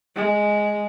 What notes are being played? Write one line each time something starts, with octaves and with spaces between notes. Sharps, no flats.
G#3